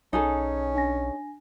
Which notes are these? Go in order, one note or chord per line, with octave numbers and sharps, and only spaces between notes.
B1 C#4 D#4 G#4 A4
D4 G#5 A#6